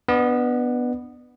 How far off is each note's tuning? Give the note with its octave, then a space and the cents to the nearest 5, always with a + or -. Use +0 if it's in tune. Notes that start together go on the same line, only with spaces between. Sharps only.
B3 +0 D4 +0 D5 +40